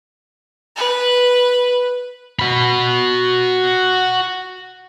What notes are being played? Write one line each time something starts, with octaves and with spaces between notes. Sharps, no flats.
B4
F#4 B5